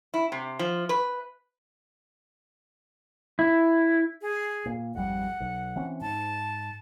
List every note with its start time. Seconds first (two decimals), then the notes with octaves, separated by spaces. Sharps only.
0.14 E4
0.32 C3
0.59 F3
0.89 B4
3.39 E4
4.22 G#4
4.66 A#2
4.94 G#1 F2 G3 F#5
5.40 B1
5.76 E3 C4 C#4
6.01 G#2 A5